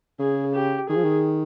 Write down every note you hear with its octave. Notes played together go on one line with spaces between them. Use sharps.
C#3 G#4
G4
D#3 G#4
F3
D#3